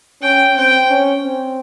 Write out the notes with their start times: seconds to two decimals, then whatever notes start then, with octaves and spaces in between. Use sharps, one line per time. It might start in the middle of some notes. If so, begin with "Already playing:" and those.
0.22 C#4 G5
0.56 C4 G5
0.90 C#4
1.24 C4